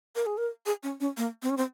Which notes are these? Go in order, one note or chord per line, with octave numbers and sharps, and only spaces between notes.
A#4
G#4
A#4
G#4
C#4
C#4
A#3
C4
C#4
C4